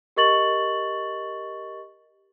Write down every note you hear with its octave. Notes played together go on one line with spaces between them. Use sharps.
G4 A#4 D#5 C#6 A6 F#7